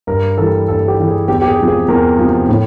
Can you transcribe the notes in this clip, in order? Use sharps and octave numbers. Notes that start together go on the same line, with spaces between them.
G2 A#4
E3 G3 A4
G2 A4
G4
E3 G3
G#4
E2 G4
G4
G#4
C3 F3
G#4
E2 A#4
C3 F3
A2